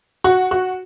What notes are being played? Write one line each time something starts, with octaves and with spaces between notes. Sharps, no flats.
F#4
F#4